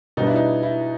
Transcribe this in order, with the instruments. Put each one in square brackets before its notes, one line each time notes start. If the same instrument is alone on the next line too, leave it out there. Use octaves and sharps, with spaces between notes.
[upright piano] B2 G3 B3 D4 [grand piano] D#4
[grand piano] E4
D#4
E4